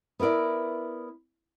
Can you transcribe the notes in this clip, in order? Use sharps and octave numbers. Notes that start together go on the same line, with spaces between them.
B3 E4 A#4 D5 E5